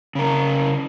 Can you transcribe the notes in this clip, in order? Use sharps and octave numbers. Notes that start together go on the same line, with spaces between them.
C#3 A#4